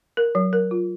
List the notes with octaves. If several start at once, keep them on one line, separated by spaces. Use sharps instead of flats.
A#4
F#3
A#4
F4